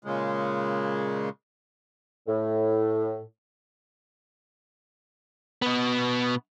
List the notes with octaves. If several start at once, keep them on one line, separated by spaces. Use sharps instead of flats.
A#2 C#3 G#3
A2
B2 B3